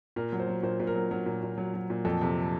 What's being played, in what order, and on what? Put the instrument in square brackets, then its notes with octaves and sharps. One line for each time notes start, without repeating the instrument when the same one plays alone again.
[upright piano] A#2 A#4
F#3
C5
F#3
A#2 C5
A#2
A#4
F#3
F#3 A#4
A#2
A#2
F#3
F#3
A#2
F2 A4
C3